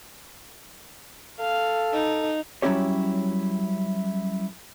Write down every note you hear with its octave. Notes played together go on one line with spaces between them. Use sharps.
A4 F5
D#4
F#3 G3 C#4 E4 G4 C#5